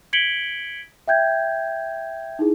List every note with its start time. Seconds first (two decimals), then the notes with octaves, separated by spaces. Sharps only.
0.13 G#6 B6 C#7 D7 F#7 G7
1.08 E5 G5 G6 G#6
2.39 D#4 E4 G#4